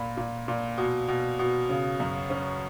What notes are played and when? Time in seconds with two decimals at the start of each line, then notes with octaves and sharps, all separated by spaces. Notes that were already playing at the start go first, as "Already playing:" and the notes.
Already playing: A#2 B5
0.17 A#2
0.48 A#2
0.78 B2
1.08 B2
1.39 B2
1.69 C#3
2.00 F#2
2.30 C#4